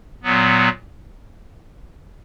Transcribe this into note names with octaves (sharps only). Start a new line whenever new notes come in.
A#2 F#3 B3